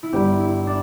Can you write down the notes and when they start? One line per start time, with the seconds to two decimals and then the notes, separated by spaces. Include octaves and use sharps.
0.03 E4
0.13 G1 G2 G3 G4
0.40 E4
0.67 D4